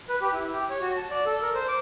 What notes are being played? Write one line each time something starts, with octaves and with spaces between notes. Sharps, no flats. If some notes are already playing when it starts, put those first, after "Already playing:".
B4
G4
E4
G4
C#5
F#4
A5
D5
A4
A#4
C5
D6